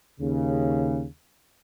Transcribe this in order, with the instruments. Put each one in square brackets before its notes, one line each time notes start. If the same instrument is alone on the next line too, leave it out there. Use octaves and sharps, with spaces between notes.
[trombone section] D#2 C#3